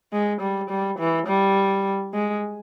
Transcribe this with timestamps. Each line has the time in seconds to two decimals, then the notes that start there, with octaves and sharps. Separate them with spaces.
0.13 G#3
0.41 G3
0.70 G3
0.99 E3
1.27 G3
2.14 G#3